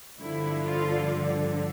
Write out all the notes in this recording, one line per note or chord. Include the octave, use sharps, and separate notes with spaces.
G2 D3 F3 E4
F4